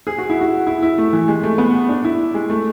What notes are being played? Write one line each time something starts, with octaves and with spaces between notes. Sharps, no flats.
G#4
F#4
E4
F#4
E4
E4
A3
E3
G#3
A3
B3
D4
E4
G#3
A3